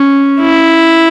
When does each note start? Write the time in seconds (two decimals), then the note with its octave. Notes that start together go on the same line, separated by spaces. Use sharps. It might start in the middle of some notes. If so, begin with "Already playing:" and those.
Already playing: C#4
0.40 E4